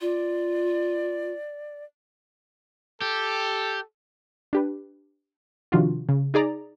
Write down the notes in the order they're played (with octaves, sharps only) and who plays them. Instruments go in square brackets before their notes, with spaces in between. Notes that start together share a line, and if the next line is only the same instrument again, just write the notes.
[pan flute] F4 [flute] D5
[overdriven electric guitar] G4 [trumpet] A4
[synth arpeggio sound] D4 G4 B4
C3 D#3 F3 D4 F4 F#4
C#3
D#4 G#4 D5 A#5